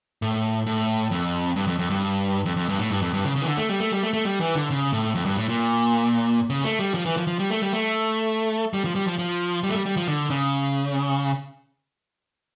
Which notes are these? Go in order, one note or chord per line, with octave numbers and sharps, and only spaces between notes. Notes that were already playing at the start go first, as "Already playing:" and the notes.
A2
A2
F2
G2
F2
F2
G2
F2
F2
G2
A2
G2
F2
G2
C#3
C#3
E3
D3
A3
G3
A3
G3
A3
A3
G3
E3
D3
C#3
A2
F2
G2
A2
A#2
C#3
A3
G3
F3
E3
F3
F3
G3
A3
G3
A3
G3
F3
G3
F3
F3
G3
A3
G3
G3
F3
D3
C#3